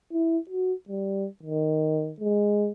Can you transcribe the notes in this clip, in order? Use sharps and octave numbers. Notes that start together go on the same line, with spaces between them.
E4
F#4
G3
D#3
G#3